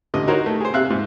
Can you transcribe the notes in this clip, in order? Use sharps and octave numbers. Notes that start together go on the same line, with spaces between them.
A1 D3 D#5
D#4 F#4 A#4 C5 C#5
A3
G#4 C5
C3 E5 F5 F#6
G#2